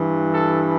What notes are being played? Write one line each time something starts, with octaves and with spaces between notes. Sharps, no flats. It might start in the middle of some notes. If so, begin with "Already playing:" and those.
Already playing: G2 E3
A4